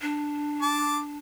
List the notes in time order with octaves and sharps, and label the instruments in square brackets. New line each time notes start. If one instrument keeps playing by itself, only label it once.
[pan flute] D4
[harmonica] A5 D6